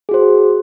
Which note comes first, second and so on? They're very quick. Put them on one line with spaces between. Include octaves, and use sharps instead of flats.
G#4 F#4 C5